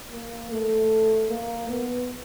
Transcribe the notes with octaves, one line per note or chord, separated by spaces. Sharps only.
A#3
A3
A#3
B3